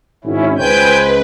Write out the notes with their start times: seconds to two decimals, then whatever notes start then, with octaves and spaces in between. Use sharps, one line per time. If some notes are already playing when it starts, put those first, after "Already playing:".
0.24 G#1 C#4 E4
0.58 C#2 B4 C5 G5 G#5 G6